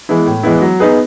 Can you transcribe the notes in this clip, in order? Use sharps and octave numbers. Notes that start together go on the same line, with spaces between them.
E3 G#3 B3 E4
A2
E3 G#3 B3 E4
F#3
B3 D#4 G#4 B4